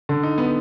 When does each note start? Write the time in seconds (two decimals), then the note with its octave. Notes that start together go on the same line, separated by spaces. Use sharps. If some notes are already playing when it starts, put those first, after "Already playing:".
0.09 D3
0.23 D#4
0.38 B3